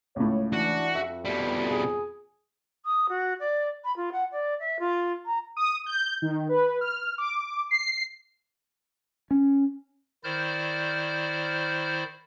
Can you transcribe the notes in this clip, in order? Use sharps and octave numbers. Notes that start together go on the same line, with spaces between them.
C#2 A2 C#5
E3 D4 F#4
F2 E5
B2 G3
G#4
D#6
F#4
D5
B5
F4
F#5
D5
E5
F4
A#5
D#6
G6
D#3
B4
F6
D6
C7
C#4
D#3 E4 C5 D5 F6 G6